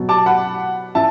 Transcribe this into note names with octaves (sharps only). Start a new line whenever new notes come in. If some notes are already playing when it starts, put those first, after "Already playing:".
Already playing: B2 F#3
A5 D6
F#5 B5
E3 E5 A5